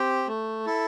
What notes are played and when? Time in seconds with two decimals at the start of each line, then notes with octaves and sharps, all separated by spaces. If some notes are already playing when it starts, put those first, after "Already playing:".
Already playing: C4 G4
0.27 A3
0.66 E4 A4